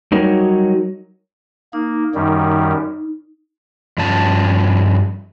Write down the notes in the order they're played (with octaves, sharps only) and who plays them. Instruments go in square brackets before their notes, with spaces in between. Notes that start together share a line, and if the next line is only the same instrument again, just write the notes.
[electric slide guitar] F#3 G3 D#4 F#4 A#4 C#5
[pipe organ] A#3 [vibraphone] D#4
[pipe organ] F#2 D#3 G3
[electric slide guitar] G2 F3 C#4 A5